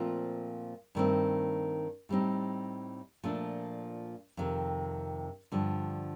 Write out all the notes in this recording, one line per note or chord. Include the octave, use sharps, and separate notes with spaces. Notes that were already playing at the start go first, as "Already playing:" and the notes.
Already playing: A#2 F3 A3 C4 F4
G2 D#3 A3 C4
A2 G3 C4 D#4
A#2 F3 A3 D4
F2 C3 D#3
G2 D3 F3